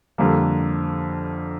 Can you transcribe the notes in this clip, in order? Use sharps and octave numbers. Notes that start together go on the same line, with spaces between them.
F2 D3 G3 A#3